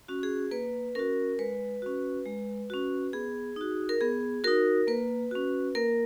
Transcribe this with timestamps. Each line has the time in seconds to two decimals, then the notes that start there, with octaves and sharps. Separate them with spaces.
0.08 C#4 F#4
0.23 G#4
0.51 A#3 B4
0.95 C#4 F#4 A#4
1.39 G#3 B4
1.82 C#4 F#4
2.25 G#3
2.70 C#4 F#4
3.13 B3 G#4
3.56 D#4 F#4
3.89 A#4
4.01 B3 G#4
4.44 D#4 F#4 A#4
4.88 A#3 B4
5.31 C#4 F#4
5.75 A#3 A#4